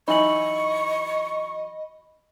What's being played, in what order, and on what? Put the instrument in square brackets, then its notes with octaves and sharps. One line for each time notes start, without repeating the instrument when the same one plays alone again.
[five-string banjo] E3 F#3 D#4 [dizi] D#5 [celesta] B5 F#7 [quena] C#6